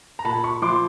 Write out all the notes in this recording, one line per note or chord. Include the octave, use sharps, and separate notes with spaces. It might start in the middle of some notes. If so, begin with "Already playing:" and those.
A#5
A#2 A5 B5
B5 C#6
F3 C6 D6